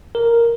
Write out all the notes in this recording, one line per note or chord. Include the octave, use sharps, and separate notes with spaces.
A#4